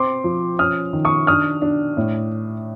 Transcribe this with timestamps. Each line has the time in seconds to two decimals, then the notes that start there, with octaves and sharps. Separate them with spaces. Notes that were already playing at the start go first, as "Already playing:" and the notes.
Already playing: C4 C6 D6
0.24 F3
0.59 C#4 D#6 F6
0.93 D#3
1.05 C#6 D#6
1.27 D4 D#6 F6
1.62 D4
1.97 A2